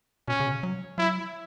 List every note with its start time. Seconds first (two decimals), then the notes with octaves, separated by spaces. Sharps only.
0.28 B2 C#4
0.40 C#3
0.46 B2
0.51 C#3
0.63 F#3
0.98 F#3 E4